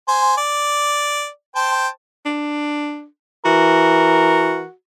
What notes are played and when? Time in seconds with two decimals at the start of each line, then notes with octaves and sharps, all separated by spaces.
0.08 C5 G#5
0.37 D5
1.56 C5 G5 A5
2.25 D4
3.45 E3 F#4 A#4